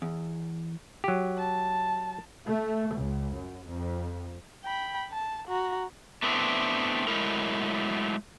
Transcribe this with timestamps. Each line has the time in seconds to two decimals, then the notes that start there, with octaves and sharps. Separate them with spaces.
0.02 E2
1.04 F#3 G4
1.38 A5
2.47 A3
2.95 C#2
3.36 F#2
3.69 F2
4.65 G5 B5
5.11 A5
5.48 F#4 A#5
6.23 A3 B3 C4 D4 E4
7.08 F#3 G#3 A3 E4 A#4